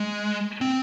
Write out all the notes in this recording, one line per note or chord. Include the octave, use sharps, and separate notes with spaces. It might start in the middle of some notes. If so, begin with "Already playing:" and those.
Already playing: G#3
C4